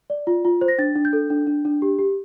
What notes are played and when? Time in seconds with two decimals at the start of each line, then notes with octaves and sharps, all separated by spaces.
0.10 D5
0.27 F4
0.45 F4
0.61 C5
0.68 A#6
0.78 D4 A6
0.96 D4
1.05 G6
1.13 A4
1.30 D4
1.47 D4
1.65 D4
1.82 G4
1.99 G4